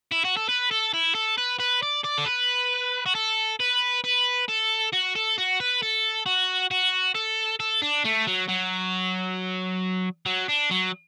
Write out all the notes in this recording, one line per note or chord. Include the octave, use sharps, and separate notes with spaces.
E4
F#4
A4
B4
A4
E4
A4
B4
B4
D5
D5
A4
B4
F#4
A4
B4
B4
A4
F#4
A4
F#4
B4
A4
F#4
F#4
A4
A4
D4
A3
F#3
F#3
F#3
D4
F#3